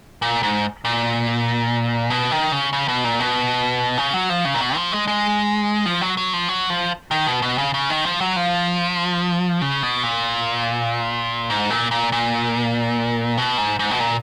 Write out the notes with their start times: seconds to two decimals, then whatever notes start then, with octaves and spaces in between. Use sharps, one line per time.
0.22 A#2
0.43 G#2
0.85 A#2
2.10 B2
2.31 D#3
2.52 C#3
2.73 C#3
2.88 B2
3.04 A#2
3.19 B2
3.98 C#3
4.14 F#3
4.29 F3
4.45 C#3
4.54 A#2
4.61 B2
4.76 F3
4.92 G#3
5.07 G#3
5.86 F3
6.01 F#3
6.17 F#3
6.33 F3
6.48 F#3
6.70 F3
7.11 D#3
7.27 B2
7.42 B2
7.58 C#3
7.74 C#3
7.90 D#3
8.05 F3
8.21 F#3
8.36 F3
9.62 C#3
9.83 B2
10.03 A#2
11.50 G#2
11.70 A#2
11.91 A#2
12.12 A#2
13.37 B2
13.58 G#2
13.79 G#2
13.91 B2
14.00 A#2